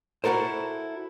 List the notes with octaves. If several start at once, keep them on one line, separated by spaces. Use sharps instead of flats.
E4 F#4 A4 A#4 C5